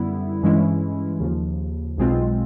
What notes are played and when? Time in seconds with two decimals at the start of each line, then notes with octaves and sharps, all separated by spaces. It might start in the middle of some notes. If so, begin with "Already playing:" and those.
Already playing: F#2 D3 G3 B3 E4
0.43 G2 E3 G#3 C#4 E4
1.20 D#2 C#3 F3
1.97 B1 B2 G#3 C4 F4